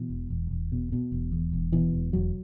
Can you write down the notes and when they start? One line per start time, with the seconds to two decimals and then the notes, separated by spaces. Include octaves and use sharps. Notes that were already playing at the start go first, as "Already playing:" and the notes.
Already playing: B2 E3
0.10 E1
0.30 E1
0.51 E1
0.72 B2
0.92 B2
1.12 E1
1.32 E2
1.53 E1
1.72 B2 E3
1.93 E1
2.13 E1 F#3